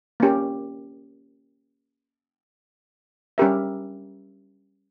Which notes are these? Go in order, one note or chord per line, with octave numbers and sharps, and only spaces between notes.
A#3 C#4 G4
G3 C#4 G4 A#4 E5